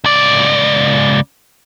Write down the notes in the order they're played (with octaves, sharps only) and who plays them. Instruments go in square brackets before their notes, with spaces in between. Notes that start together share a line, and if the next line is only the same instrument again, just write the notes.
[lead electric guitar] C#2 D5